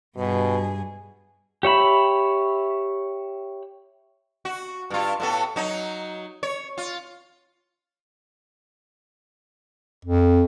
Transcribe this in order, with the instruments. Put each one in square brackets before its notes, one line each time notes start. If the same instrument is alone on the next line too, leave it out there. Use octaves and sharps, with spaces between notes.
[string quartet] G2 G#4 [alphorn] B2
[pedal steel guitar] G4 C#5 E5 B5
[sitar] F#4
G2 F4
A2 B3 A4
F#3 D#4
C#5
F4
[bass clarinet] F2